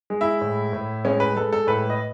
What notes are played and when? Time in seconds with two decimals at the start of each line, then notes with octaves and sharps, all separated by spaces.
0.10 G#3
0.21 E4 E5
0.41 A2
0.73 A2
1.05 G#3 C#4 C#5
1.20 B4
1.36 G#3 A4
1.52 A4
1.67 A2 B4
1.90 D#5